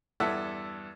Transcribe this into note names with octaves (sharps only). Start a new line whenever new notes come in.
E2 G2 E4 A4 E5 F#5